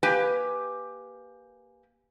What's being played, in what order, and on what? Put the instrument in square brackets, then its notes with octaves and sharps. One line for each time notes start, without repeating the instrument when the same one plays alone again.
[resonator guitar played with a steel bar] A#3 G4 B4 G5 G#5